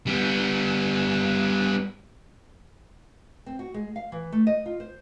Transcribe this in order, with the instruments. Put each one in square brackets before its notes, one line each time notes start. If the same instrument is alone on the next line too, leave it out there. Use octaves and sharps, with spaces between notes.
[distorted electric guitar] G3 B3
[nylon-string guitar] C4
F#4
G#3
F5
E3
A3
D#5
F4
C5